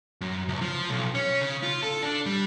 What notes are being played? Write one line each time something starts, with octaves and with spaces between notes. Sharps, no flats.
F#2
C#2
F3
B1
C#4
C#3
F4
A4
D4
G3